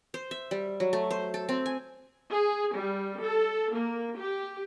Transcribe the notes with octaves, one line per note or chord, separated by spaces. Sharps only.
C5
E5
G3
F#3
A3
C5
A4
C4
G#5
G#4
G3
A4
A#3
G4